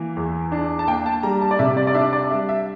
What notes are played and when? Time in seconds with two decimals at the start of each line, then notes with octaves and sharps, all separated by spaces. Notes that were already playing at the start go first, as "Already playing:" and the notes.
Already playing: E3 A#3
0.17 E2
0.52 D4
0.79 A5
0.88 A#3 G5
1.06 A5
1.23 G3 A#5
1.41 A5
1.51 D5
1.59 C3 E5
1.77 D5
1.87 D5
1.94 D4 E5
2.13 D5
2.30 G3 E5
2.49 E5